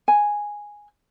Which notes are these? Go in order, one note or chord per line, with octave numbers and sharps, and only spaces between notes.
G#5